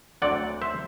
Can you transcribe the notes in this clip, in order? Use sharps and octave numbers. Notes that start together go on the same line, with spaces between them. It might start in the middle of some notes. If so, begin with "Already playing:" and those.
D2 D3 F#3 C4 D5 F#5
C5 E5